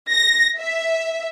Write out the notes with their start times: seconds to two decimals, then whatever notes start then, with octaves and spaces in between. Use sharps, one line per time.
0.11 A#6
0.59 E5